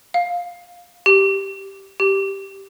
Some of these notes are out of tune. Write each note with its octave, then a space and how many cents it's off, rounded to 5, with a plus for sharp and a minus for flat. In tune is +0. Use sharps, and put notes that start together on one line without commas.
F5 +10
G4 -5
G4 -5